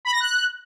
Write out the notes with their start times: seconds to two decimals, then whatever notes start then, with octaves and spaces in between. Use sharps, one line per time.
0.05 B5
0.12 A#6
0.20 F#6